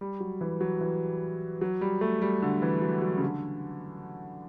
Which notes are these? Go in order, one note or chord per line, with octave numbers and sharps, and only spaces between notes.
G3
F#3
E3
F#3
E3
F#3
G3
A3
G3
D3
E3
F#3
F#3
C#3
D3